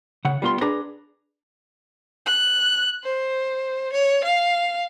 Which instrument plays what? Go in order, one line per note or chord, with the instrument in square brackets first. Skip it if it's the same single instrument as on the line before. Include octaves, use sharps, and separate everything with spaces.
[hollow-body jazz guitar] C#3 F#5
G3 B3 F4 A#5 C6
D4 G#4 B4 A#5
[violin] F#6
C5
C#5
F5